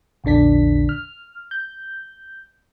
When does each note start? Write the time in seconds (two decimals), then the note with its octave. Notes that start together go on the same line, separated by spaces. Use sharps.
0.24 A#1 E2 D3 D4 B6
0.89 F6
1.51 G6